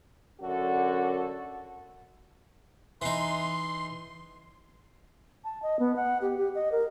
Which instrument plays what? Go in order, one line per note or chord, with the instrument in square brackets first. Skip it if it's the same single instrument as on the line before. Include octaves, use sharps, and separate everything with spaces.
[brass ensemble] F#2 D3 F#4 A4
[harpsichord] E3 D#4 [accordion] C6
[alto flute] A5
D#5
B3
F#5
G4
G4
D#5
A#4